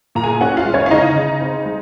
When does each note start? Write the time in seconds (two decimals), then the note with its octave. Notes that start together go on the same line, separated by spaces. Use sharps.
0.15 A#2 A#5
0.24 G#4 G#5
0.41 C#4 F#4 F#5
0.57 F4 F5
0.66 G#3
0.74 C#4 C#5
0.86 F5
0.91 C#3 D#4 D#5
1.16 C#3
1.41 C4
1.66 G#3